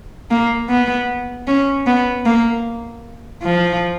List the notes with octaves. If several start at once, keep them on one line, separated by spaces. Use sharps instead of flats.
A#3
B3
C#4
B3
A#3
F3